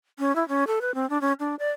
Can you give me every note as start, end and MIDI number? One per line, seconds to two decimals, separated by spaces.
0.19 0.35 61
0.36 0.46 64
0.48 0.64 61
0.67 0.79 69
0.81 0.94 71
0.95 1.08 60
1.10 1.20 62
1.21 1.33 61
1.40 1.55 62
1.59 1.71 74